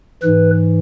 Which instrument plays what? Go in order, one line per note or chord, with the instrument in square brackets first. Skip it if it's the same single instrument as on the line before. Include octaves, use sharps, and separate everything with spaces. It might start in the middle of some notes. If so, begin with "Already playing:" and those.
[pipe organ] G#2 E3 B4